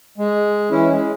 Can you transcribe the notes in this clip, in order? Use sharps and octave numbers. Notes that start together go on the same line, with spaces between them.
G#3
E3 C#4 E4
G#3